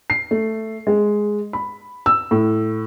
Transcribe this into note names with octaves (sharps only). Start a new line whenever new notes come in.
C7
A3
G#3
B5
E6
A2